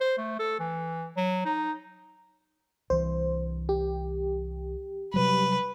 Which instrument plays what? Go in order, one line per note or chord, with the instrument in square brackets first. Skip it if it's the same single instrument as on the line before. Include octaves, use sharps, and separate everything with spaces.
[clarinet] C5
A3
A4
E3
F#3
D#4
[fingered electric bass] C2 E3 [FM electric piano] C5
[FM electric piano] G4
[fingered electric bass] C3 F#3 G3 [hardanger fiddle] B4